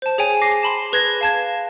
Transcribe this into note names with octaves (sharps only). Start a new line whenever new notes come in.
C5 A5
G#4 C#5 G5 G#5
D6 A#6 C7
A5 B5 C6
G#4 B4 G#6 A#6
F5 A5 G#6